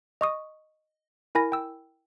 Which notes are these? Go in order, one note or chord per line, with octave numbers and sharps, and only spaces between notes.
D#5 C#6 D#6
E4 A#4 G#5 B5 A#6
G5 E6